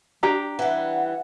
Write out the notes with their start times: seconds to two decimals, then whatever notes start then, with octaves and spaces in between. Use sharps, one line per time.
0.23 D4 G4 A#5
0.59 E3 G3 F#5